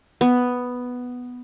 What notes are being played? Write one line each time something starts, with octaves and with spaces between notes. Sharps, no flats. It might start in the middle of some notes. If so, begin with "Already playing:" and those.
B3